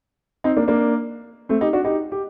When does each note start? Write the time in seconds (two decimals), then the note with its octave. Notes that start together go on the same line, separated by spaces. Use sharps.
0.44 C4 D#4
0.57 A#3 D4
0.68 A#3 D4
1.49 A3 C4
1.61 D#4 G4
1.73 D4 F#4
1.84 D#4 G4
2.12 G4